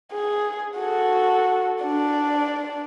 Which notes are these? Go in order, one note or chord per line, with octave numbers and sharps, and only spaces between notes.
G#4
F#4 A4
D4 D5